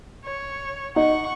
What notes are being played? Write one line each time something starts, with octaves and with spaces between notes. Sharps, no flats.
C#5
D#4 F#5 C#6